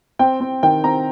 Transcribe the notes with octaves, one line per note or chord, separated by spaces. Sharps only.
C4 G5
C4
D#3 G5
C4 A#5